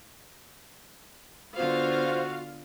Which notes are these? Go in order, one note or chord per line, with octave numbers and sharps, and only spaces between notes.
D3 B3 F4 F#4 C5 F5